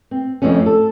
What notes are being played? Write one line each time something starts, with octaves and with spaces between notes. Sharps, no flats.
C4
F2 F3 A3 C4 C#4
A4